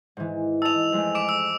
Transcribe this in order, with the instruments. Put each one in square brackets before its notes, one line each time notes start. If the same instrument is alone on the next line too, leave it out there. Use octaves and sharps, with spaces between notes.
[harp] G#2 E3
[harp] D#5 A5 [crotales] E6 F7
[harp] F2 G#3 A3
[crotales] D6 D7
E6